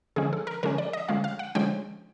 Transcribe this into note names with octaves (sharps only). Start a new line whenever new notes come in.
D3 F3 G#3 C#4 G#4
A4
A#4
D3 F3 G#3 C#4 A#4
D5
D#5
D3 F3 G#3 C#4 F5
F5
F#5
D3 F3 G#3 C#4 G5